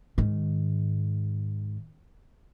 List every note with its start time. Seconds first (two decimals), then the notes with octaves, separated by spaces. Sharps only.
0.18 G#2 D#3